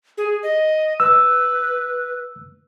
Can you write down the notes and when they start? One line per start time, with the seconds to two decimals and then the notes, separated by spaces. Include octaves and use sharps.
0.18 G#4
0.43 D#5
1.00 B4 E6